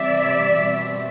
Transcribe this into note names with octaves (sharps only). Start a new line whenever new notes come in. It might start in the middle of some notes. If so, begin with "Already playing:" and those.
Already playing: C3 E3 G3 C4 D5 E5
B2 G3 C4